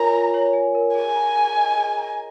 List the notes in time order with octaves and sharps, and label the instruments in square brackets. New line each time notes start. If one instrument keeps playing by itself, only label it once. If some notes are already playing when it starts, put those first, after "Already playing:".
Already playing: [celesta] F4 A#4 C#5 G#5 [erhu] A#5
[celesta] F4
C#5
G#5
A#4
[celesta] G#4 [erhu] G#5
[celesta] A#5
G#4
D#5
G#4
A#5